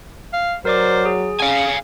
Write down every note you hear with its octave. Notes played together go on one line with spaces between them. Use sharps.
F5
F#3 A#4 C5 D5 D6
G#4
C#4 F5 G#5